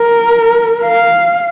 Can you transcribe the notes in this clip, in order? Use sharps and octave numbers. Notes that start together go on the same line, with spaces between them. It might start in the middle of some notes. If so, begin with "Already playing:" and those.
Already playing: A#4
F5